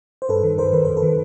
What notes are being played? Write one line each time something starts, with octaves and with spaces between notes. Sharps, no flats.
C5
G2 A4 B4
D#3
G2 A#4 C5
D#3 B4
F#2 C5
A4 B4
D#3